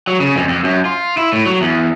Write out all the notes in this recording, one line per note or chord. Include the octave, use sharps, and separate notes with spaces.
F#3
C#3
F2
F2
F#2
F4
E4
A2
F#3
E2